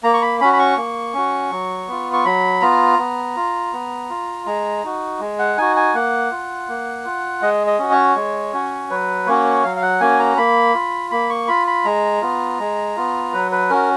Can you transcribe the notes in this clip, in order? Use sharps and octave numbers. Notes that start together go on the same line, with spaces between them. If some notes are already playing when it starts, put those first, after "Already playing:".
A#3 A#5
C#6
B5
C#4 F#4 B5
B5
C#6
A#3
C#4 F#4
F#3
B3 F4
C#6
F#3 B5
B3 F4 A#5
B3
F4
B3
F4
G#3 A#5
D#4 F#4
G#3
F#5
D#4 F#4 G#5
G#5
A#3 F#5
F4
A#3
F4
G#3 D#5
D#5
C#4 F#4
C#5
G#3
C#4 F#4
F#3 B4
A#3 C#4 F#4 C#5
F#3 F5
F5
F#5
A#3 C#4 F#4 G#5
A#5
A#3 B5
F4
A#3 B5
C#6
F4 B5
B5
G#3 A#5
B3 F4
G#3
B3 F4
F#3 B4
B4
C#4 F#4 A#4